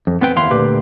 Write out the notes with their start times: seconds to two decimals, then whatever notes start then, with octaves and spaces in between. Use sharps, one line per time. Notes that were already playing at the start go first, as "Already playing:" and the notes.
0.07 F2
0.21 B3 C4 B4 G5
0.36 D#2 E4 F5 C6
0.51 D2 A#2 G4 B4